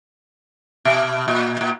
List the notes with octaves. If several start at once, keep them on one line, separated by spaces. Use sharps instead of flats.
B2
A#2
A#2